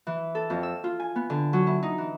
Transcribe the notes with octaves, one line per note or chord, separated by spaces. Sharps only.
E3
A4
F2
E6
F4
G#5
B3
D3
F#3
E4
D#4
E3